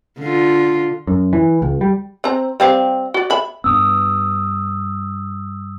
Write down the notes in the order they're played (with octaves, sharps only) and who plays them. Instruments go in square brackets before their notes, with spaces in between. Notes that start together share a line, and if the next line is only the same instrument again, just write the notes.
[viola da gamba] D3 F4
[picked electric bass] F#2
E3
C#2
G3
[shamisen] C4 A#5
G3 C4 F5
F#4 D5
E5 B5
[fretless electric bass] G2 B3 [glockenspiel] D#6 E6